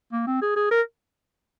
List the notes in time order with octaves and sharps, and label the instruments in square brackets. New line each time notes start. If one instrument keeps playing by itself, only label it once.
[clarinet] A#3
C4
G#4
G#4
A#4